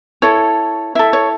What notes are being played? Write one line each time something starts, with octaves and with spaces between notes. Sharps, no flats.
E4 A4 C#5
E4 A4 E5
C#5